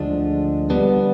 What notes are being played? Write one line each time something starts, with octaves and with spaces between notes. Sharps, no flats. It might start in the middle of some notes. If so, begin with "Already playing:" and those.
Already playing: D2 D3 F3 G#3 D4
D3 G3 B3 D4